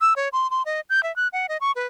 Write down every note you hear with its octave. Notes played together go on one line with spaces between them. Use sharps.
E6
C#5
C6
C6
D#5
G6
E5
F#6
F#5
D#5
C#6
B4